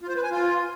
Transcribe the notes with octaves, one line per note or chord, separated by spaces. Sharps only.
F4
C5
B4
G#5
F4